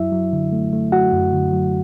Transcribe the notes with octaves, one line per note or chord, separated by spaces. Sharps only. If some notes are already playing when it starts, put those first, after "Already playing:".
Already playing: F#2 F#3 E4 E5
F#3
D3
A3
A3
F#3 F#4 F#5
F#2
D3
F#3